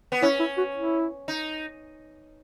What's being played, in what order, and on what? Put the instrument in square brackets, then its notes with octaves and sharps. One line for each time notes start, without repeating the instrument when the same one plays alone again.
[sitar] B3
[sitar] C#4 [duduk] E4
[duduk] E4
F#4
E4
[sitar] D#4